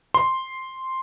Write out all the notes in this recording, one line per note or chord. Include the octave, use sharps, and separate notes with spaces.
C6